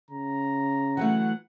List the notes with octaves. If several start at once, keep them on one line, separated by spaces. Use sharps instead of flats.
C#3 A#5
E3 F#3 A3 F#5